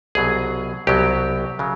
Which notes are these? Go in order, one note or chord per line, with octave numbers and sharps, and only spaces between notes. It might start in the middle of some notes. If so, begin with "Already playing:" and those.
C2 B2 F#3 G#4
C2 B2 F#3 G4
C#3 F#3